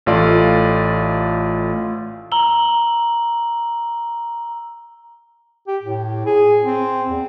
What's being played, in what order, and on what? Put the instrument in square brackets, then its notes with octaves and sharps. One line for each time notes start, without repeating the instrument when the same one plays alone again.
[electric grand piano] A1 A3 F4 D5
[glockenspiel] A#5 E6 F#7 G7
[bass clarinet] G4
A2
G#4
C4
E2